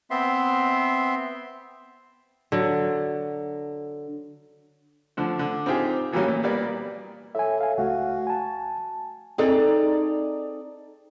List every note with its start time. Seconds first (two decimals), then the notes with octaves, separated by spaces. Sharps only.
0.11 B3 C4 E5 C6
2.52 D3 F#3
5.17 D3 F3 A3
5.39 D3
5.66 C4 D#4 F4 G4 G#4
6.12 D#3 E3 F#3 G3 A#3 C#4
6.28 A#2
6.43 G3 A#3 B3 D5
7.35 A2 E5 G#5
7.60 F5 G#5
7.78 C#2 A3 F#4 F5
8.27 G#5 A5
9.38 C4 D#4 G#4 A4 D5 A#5